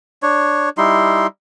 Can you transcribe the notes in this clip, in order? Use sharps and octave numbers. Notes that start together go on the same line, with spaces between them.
D4 C#5
G3 D#4 E4 C6